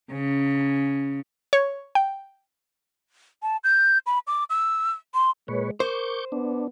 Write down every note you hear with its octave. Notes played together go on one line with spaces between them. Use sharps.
C#3
C#5
G5
A5
G6
B5
D6
E6
C6
A#2 G#3 B4 C#5
A#4 C5 C#6 D6 G6
B3 D4